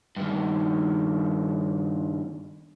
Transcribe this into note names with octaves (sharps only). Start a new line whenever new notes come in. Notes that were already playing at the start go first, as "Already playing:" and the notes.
G2 D#3